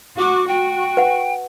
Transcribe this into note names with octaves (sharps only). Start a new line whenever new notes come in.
F#4 D6
F#4 G5
B4 F#5